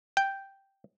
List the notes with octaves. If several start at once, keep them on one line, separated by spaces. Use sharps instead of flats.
G5